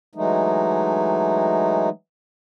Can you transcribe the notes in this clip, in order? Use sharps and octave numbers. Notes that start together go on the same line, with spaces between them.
E3 F#3 G#3 A3 D#4